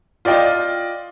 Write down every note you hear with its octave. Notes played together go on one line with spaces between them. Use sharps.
F4 D5 D#5 G5